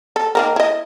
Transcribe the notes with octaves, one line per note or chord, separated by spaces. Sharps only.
A4
D#3 A#3 A#4
E4 D#5